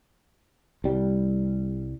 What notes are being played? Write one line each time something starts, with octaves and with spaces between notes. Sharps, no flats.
C2 G3